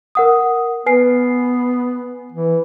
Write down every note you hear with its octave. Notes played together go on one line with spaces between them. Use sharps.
A#4 F#5 D#6
B3 B4 G#5 C7
E3